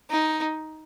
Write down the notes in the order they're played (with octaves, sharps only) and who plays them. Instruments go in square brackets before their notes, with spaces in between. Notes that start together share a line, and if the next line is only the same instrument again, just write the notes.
[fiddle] D#4